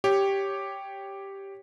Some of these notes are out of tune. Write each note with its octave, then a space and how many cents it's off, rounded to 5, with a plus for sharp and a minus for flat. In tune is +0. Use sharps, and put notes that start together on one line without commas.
G4 +0 C#5 +0